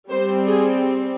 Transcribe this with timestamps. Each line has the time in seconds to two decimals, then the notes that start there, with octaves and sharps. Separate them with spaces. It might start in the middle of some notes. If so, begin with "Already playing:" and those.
0.11 G3 C4 C5
0.47 G#4